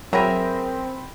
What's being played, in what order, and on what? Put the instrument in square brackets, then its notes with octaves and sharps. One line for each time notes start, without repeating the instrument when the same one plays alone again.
[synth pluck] F#3 [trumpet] C4 [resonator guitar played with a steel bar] G#4 A#4 E5 [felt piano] G5 B5 A#6